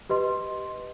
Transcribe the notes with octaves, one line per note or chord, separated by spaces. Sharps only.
G4 B4 D#5 C6